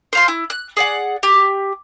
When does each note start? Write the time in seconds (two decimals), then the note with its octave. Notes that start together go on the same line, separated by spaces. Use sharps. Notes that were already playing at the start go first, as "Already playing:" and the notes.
0.13 C5 F5 C6
0.28 E4
0.50 F#6
0.77 G#4 D5 F#5
1.23 G4